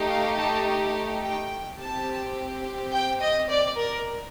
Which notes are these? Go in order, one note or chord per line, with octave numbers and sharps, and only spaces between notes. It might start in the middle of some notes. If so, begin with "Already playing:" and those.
Already playing: A3 D#4 G4
F5
A5
G5
C4 G4 A5
G5
D#5
D5
A#4